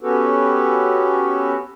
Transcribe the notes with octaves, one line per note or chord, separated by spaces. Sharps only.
B3 C#4 F#4 G4 A4 B4